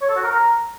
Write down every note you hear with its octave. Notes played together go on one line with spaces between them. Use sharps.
C#5
A4
F#4
A#4
A#5